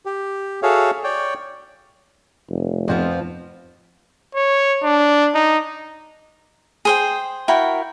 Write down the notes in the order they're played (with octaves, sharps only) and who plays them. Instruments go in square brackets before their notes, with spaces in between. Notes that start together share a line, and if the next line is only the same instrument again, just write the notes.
[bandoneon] G4
F#4 G#4 A4 C#5 E5 F5
C#5 D5 G5
[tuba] F1
[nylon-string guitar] F2 F3 B3
[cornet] C#5
D4
D#4
[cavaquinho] G#4 C5 G5
E4 F#4 A#4 G5